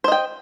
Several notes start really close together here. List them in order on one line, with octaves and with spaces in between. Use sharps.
C5 D#5 G5